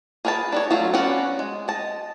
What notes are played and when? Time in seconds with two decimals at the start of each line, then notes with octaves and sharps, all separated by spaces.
0.25 G#4 A#4 B4 D5 A5
0.52 D4 D#4 C#5
0.71 F#3 A3 F4
0.93 B3 C#4 D4 F#4 F#5
1.39 G#3
1.68 D#5 A5